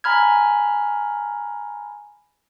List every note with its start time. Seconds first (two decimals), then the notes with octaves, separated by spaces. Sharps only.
0.04 G#5 A#5 B5 F6 G#6